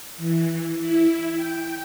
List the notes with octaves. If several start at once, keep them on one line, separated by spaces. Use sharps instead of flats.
E3
E4
G5